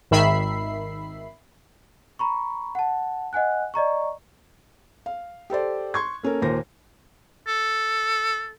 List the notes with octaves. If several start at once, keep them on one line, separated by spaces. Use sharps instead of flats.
G#1 D#3 E5 B5 C7
A#5 B5 C#6
F#5 A5
D#5 F#5 G#5 F#6
D5 D#5 A#5 C#6
F5
G4 A4 C5 D5
C6 C#6 G#6
A#3 C#4 A4 A#4
D#2 A#2 A#4 C5 A#6
A4